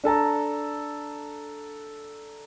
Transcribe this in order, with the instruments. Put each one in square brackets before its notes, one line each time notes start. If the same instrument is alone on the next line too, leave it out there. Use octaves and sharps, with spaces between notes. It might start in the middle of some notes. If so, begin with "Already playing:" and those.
[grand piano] D4 A4 A5 A#5